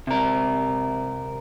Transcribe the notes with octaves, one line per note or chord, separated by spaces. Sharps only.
C3 A#4